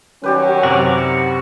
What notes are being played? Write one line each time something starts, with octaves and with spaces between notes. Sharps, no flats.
D#3 F#3 G3 C#4 G4 B4
F#2 C3 F#4 A#4 D5
F#4